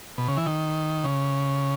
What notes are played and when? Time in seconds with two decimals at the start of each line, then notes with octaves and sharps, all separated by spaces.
0.18 B2
0.28 C#3
0.37 E3
0.46 D#3
1.04 C#3